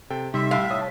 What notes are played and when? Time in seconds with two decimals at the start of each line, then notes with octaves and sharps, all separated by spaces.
0.10 C3 A4 G5
0.34 C3 G3 D#4 E5 C6
0.51 A2 F5
0.71 C#5 A5 D#6